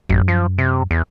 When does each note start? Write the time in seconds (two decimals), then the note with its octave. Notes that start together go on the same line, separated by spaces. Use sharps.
0.09 A1 F#2
0.28 F3
0.58 C3
0.91 E2